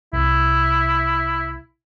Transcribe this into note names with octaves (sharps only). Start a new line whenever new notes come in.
C2 E4